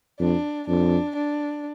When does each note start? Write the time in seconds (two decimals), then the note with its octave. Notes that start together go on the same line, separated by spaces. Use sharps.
0.20 F2 D4
0.67 F2 D4
1.16 D4